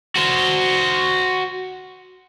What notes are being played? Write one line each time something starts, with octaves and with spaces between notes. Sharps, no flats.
F#4 C5